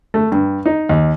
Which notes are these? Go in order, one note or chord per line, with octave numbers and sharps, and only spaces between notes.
A3
G2
D#4
D#2